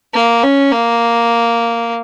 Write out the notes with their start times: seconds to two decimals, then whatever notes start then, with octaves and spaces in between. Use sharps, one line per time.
0.14 A#3
0.43 C#4
0.71 A#3